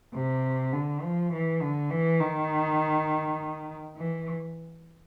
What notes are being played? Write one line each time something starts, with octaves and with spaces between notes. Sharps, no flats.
C3
D3
F3
E3
D3
E3
D#3
E3